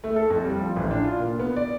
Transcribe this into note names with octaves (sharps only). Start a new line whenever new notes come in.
A3
A4
F2
G3
F3
A1
D4
F4
A#2
B3
D5